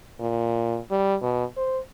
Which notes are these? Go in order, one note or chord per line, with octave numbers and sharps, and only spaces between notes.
A#2
G3
B2
C5